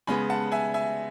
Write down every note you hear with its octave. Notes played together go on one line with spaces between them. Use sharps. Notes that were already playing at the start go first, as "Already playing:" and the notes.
C#3 G#3 B3 G#5 B5
F#5 A5
E5 G#5
E5 G#5